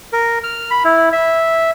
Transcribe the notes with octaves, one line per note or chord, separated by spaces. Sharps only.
A#4
F6
B5
E4
E5